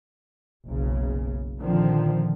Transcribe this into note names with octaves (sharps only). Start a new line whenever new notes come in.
F#1 B1 C#3
A#2 D3 D#3 F3 C4